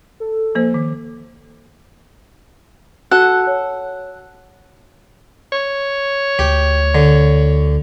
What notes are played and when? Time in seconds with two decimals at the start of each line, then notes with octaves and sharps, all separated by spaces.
0.20 A4
0.55 F3 A#3 C5
0.74 D#3
3.11 F#4 A4 F#5 F#6
3.47 C#5
5.53 C#5
6.39 D2 G4
6.95 D3